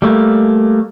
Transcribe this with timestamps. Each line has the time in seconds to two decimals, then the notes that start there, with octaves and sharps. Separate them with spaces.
0.02 G3 A3 A#3